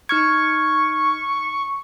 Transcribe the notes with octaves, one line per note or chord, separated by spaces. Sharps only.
D#4 C#6 F6 G#6